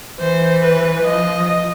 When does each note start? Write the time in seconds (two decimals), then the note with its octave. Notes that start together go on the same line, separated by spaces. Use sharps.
0.20 E3 C5
0.62 B4
1.04 F3 D#5